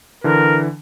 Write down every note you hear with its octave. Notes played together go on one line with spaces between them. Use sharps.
D3 E3 A#4